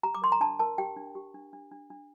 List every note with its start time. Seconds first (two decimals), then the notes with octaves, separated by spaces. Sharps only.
0.03 G4 A#5
0.15 D6
0.22 A#4 C6
0.32 A#5
0.41 D4 A5
0.59 A#4 A5
0.78 G4 G5
0.97 D4
1.15 G4
1.34 D4
1.53 D4
1.72 D4
1.90 D4